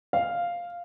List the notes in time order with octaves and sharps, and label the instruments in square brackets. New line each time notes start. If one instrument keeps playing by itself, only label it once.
[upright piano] F5